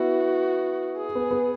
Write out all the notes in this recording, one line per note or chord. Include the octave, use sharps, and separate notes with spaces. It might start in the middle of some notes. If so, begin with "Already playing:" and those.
Already playing: B3 E4 F#4
G#4
B3
B3